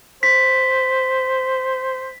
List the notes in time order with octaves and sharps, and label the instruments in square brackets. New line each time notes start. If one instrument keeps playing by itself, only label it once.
[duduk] C5 [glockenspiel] B6